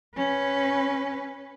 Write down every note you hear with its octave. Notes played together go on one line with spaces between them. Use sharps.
C#4 B4